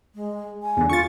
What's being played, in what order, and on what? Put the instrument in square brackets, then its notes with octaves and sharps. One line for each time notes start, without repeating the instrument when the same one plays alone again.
[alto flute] G#3
G#5
[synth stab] E2 D3
[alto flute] F4 [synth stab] C#6 A6